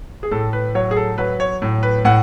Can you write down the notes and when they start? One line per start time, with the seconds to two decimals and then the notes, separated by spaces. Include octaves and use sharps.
0.23 G#4
0.31 A2 A4
0.53 B4
0.75 F#3 C#5
0.91 G#4
0.97 A4
1.18 F#3 B4
1.40 C#5
1.62 A2
1.83 B4
2.05 A2 F#5